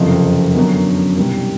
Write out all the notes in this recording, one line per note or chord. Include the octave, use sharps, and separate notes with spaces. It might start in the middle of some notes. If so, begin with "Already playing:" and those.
Already playing: F#1 F2 C3
F#2 D3 F#3 B3
C2 B2 G3